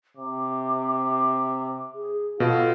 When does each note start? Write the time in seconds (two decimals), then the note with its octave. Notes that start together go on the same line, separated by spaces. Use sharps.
0.17 C3 D6
1.95 G#4
2.40 B2 F4 A4